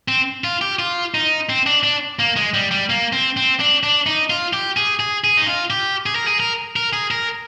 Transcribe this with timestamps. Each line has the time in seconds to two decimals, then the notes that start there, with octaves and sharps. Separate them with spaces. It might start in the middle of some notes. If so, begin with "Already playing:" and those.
0.08 C4
0.44 F4
0.61 G4
0.79 F4
1.14 D#4
1.49 C4
1.66 D4
1.83 D4
2.19 A#3
2.36 G#3
2.54 G3
2.71 G3
2.90 A#3
3.13 C4
3.37 C4
3.60 D4
3.83 D4
4.06 D#4
4.30 F4
4.53 G4
4.77 G#4
5.00 G#4
5.24 G#4
5.37 D#4
5.46 F4
5.70 G4
6.06 G#4
6.15 A#4
6.27 G#4
6.40 A#4
6.76 A#4
6.93 G#4
7.11 A#4